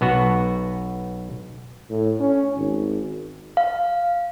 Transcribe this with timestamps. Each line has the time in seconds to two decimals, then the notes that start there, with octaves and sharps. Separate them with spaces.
0.01 B1 B3 F#4
1.90 A2
2.20 C#4
2.56 G#1
3.57 F5